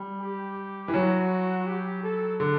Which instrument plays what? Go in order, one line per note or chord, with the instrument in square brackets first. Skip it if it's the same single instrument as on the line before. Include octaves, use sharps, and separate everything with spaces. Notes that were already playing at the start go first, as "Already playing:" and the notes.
Already playing: [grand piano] G3
[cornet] G4
[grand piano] E3
[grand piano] F#3 [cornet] F#4
[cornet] G4
A4
[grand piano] D3